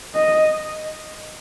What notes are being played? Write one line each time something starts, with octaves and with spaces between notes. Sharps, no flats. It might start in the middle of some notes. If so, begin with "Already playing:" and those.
D#5